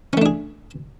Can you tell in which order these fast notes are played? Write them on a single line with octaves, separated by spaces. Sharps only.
C#4 A3 D4 G#4